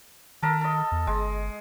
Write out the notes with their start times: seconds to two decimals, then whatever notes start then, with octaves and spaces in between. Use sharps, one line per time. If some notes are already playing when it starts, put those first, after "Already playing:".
0.42 D#3 A4 A#4 E5
0.61 A4 D#5
0.92 E2
1.07 G1 G#3